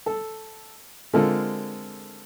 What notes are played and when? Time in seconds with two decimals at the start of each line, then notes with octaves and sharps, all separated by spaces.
0.06 A4
1.13 D3 G#3 C4 F4 A4 A#4